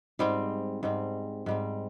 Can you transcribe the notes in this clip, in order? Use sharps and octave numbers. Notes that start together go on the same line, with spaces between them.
G#2 G3 C4
G#2 G3 C4
G#2 G3 C4